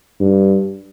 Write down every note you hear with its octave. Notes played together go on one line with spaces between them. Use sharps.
G2